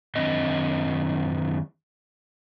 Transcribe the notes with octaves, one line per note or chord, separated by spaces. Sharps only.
F#2 D#3 C4 D4 D#5